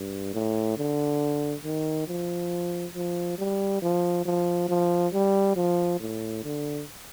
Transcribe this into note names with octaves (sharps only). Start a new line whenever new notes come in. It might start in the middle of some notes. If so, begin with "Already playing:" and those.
Already playing: G2
A2
D3
D#3
F3
F3
G3
F3
F3
F3
G3
F3
A2
D3